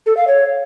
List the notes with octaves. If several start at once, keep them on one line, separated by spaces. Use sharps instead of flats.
A4
F5
C#5